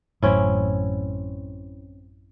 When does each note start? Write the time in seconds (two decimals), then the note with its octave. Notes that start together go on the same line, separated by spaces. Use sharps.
0.22 A1 F#2 A2 C4 C#4 E4